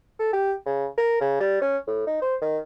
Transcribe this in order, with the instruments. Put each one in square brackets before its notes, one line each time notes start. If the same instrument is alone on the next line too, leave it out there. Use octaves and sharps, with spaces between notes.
[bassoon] A4
G4
C#3
A#4
C#3
G3
C#4
A2
D#4
C5
D#3